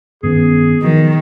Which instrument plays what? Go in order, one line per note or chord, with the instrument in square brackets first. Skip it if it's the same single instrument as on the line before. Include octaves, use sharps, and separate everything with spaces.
[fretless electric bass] G2 D#3 C#4 [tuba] B3 [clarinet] G#4
[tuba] B2 [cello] D#3 [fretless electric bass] F3 F#3